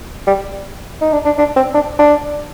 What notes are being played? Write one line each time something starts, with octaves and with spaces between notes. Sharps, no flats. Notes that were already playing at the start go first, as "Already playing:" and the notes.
G3
D#4
D4
D4
D4
C4
D4
D4